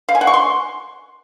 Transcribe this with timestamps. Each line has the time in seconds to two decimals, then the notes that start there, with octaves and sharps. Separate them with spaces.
0.09 F5
0.15 G#5
0.21 F#5
0.27 C#6
0.34 C6